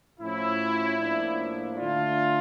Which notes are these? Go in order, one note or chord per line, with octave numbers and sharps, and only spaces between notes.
A2 F3 C#4 E4
A2 F3 A#3 D4
D3 A3 D4 F4